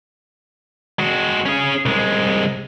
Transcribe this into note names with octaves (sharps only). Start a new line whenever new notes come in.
G#3 F#4
C#4 G#4
C2 G#3